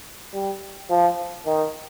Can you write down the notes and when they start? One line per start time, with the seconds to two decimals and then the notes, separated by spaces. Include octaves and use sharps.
0.34 G3
0.90 F3
1.46 D#3